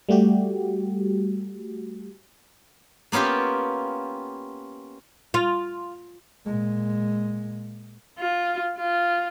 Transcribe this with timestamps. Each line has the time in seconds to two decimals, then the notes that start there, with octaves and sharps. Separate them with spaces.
0.09 G3 A3 F#4 G4
3.12 A#3 B3 C#4 F4 G4
5.34 F4
6.45 A#2 G#3
8.19 F4
8.78 F4